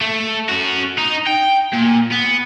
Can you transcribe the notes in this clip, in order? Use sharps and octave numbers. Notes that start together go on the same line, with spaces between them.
A3
C#4 F#4
D#4
G5
A#2
B3